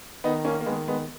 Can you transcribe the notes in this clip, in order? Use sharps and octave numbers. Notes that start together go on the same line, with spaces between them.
D#3 B3 D#4
A#3 C#4
A#3
D#3 G#3 B3
G#3 B3